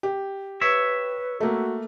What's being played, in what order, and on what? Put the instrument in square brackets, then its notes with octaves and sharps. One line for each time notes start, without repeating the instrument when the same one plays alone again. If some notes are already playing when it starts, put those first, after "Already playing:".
[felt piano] G4
[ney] B4 [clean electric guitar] C#5 E5
[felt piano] A3 A#3 [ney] F#4